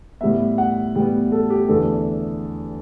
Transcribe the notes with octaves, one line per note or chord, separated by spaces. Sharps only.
A2 G3 B3 E5
F#5
A2 G3 B3 G5
A4
G4
E2 D3 A3 A4